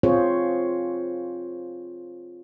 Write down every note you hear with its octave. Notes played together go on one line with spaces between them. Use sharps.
C4 F4 G#4 C5 C#5